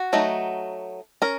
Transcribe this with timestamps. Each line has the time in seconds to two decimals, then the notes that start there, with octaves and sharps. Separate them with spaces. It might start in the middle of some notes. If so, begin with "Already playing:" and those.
Already playing: F#4
0.13 F#3 A3 D#4
1.22 C#4 A#4